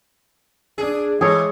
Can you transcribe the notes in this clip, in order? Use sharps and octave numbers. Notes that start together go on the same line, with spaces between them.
D4 G#4
E3 G#3 G#4 A4 C#5